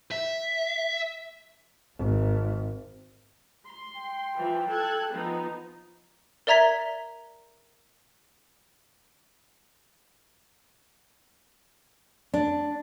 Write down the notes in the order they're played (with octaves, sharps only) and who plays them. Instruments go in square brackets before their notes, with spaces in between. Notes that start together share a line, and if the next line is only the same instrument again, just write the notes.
[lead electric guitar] E5
[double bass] G#1
[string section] C6
[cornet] G5
[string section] E3 F3
A4 F#6 G#6
F3 B3 D#4
[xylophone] A#4 D5 E5 A#5 G#6 B6
[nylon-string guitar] D4